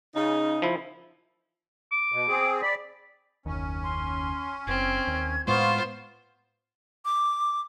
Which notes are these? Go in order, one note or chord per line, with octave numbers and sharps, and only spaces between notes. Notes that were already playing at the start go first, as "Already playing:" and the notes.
C#3 D#4
F3 E4
D6
B2
C4 G#4
D5 B5
F#1 D#2 C#4
C6
F#1 C4 G#6
D#2
A2 G#3 B3 F4 C5 C#6
D6